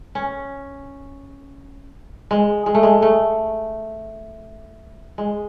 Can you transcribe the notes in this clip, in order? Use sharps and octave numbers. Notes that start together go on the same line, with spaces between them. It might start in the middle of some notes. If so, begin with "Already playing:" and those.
C#4
G#3
G#3
A3
G#3
A3
G#3